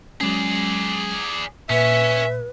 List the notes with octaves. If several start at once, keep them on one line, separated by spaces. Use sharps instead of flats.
F#3 G#3 C#4 G#4 D5
A#2 C#4 B4 E5